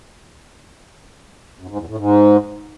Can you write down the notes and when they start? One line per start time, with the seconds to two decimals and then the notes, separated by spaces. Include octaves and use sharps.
1.60 F#2
1.69 G#2
1.79 E2
1.88 A2
1.98 G#2